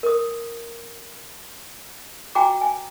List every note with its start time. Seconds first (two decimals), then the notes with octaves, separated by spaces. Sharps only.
0.03 A#4 D#6
2.35 F#4 G5 G#5 A#5 D6
2.61 G#5